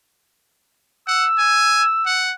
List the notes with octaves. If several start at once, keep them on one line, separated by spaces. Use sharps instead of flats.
F#5 E6
G#5
F#5